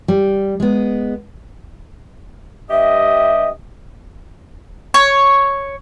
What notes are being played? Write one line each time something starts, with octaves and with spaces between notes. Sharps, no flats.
G3
G#3 B3
G2 G4 D#5 E5
C#5